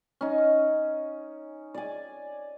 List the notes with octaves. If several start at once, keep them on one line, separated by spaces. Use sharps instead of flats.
C#4 D#4
D5 G#5